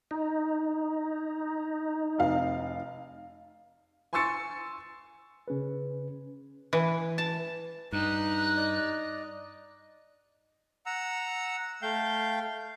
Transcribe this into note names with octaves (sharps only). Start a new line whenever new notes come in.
D#4
F1 F5
G#5 C6 C#6 E6 A6 C#7
C#3 C#4 G#4 B4
E3
A5
G2 D#4 G4 F#6
D5 D#5
F#5 A#5 E6
A3 F5 G5 G6